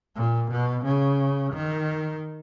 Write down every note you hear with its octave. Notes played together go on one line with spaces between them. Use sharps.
A#2
B2
C#3
D#3